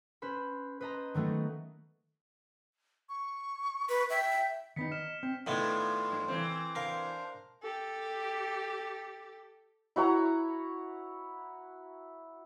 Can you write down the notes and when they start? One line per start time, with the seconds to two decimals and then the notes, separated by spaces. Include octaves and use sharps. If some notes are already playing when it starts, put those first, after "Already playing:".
0.22 C#4 B4 C5 B5
0.81 B4 C5 D#5 A5 A#5
1.14 D#3 F#3 A3 B3 F#4
3.09 C#6
3.89 B4
4.10 E5 G5
4.76 D#3 B3 D#4 B6 C#7
4.92 D#5 F6 E7
5.23 C4
5.47 A2 D#3 A3 B3 F4 D5 F5
6.12 G2
6.28 E3 C4
6.75 D4 A#4 C5 F5
7.62 G4 A4
9.96 E4 F#4 C#5 A#5